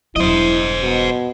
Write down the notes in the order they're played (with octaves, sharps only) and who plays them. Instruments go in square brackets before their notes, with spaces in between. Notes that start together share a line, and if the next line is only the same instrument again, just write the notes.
[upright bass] E1 F#3 [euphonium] E4 [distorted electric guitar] C5 D#5
[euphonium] B2